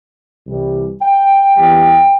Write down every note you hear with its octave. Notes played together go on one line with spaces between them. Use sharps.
C2 C3 E3 G3
G5
E2 E3 G3 G5